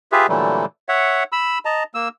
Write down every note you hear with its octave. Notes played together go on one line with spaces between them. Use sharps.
F4 G4 G#4 B4 E5
A#2 D3 E3 F#3 G3 A3
C#5 E5 F#5
B5 E6
D#5 A5 A#5
A#3 E6